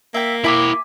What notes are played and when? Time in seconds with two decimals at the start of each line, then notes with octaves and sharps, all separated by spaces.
0.14 A#3 E5 G5
0.44 E4 E5 G5 G#5 D6